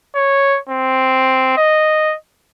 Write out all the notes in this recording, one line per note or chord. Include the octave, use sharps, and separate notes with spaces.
C#5
C4
D#5